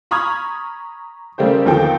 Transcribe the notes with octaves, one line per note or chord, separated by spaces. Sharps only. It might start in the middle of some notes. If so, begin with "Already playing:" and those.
A#5 B5 C#6 D#6 F6 G#6
C#3 G3 A3 A#3 G4 C5
G1 D#2 F3 C4 A4 G5